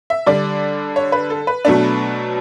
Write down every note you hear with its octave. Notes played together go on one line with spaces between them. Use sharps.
E5
D3 G3 D4 D5
C#5
B4
A4
B4
B2 F#3 A3 D4